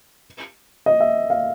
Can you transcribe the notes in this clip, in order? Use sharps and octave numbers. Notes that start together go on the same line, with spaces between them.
D#5
E5
F5